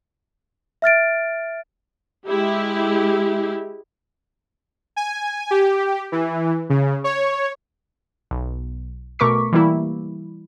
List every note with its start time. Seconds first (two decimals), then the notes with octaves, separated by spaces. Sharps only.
0.82 E5 F6 A6 D7
2.27 G#3 E4 G4
4.96 G#5
5.51 G4
6.12 E3
6.70 C#3
7.04 C#5
8.31 B1
9.19 B2 A3 A#4 C#6 D6 B6
9.52 E3 G3 A#3 E4